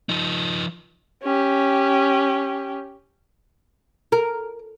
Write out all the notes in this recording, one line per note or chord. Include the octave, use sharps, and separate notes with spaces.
F3 D#4
C#4 G4
A#4